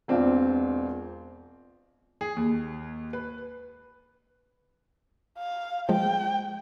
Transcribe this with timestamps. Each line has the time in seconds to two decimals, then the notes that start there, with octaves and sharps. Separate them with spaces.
0.08 E1 C4 D4 F4 F5
2.21 G#4
2.36 D#2
3.13 B4
5.39 F5
5.89 F3 G#3 G5